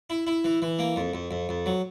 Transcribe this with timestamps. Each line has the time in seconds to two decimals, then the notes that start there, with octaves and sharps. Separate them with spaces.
0.10 E4
0.27 E4
0.44 E3
0.62 E3
0.79 A#3
0.96 F2
1.14 F2
1.31 F2
1.49 F2
1.66 F#3